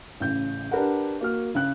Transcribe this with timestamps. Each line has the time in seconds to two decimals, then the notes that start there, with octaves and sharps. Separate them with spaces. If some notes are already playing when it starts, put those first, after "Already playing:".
0.20 A1 C#3 G6
0.71 D4 G4 A#4 B4 F#5
1.21 A#3 F#4 F6
1.55 C#3 F#6